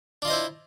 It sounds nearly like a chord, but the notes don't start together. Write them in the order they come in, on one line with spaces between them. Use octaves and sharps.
D4 F4 D#5 C5 E4